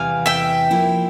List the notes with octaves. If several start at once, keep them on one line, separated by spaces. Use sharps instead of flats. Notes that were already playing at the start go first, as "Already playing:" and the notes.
Already playing: E2 C3 E3 G3 F5 G#5
E5 G5
F3 A#3 E4